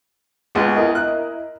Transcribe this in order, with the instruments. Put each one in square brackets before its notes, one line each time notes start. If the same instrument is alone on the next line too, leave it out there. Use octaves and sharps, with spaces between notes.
[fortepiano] C#2 B3 [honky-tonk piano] G#3
[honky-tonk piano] E4 A#4 D#5
[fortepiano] F#6